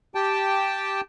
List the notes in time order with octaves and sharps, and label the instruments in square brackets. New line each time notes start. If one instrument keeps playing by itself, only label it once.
[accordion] G4 G5 A5